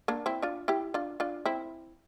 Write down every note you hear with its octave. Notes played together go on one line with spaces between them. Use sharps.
A#3 D4
C4 E4
D4 F4
E4 G4
D4 F4
D4 F4
C4 E4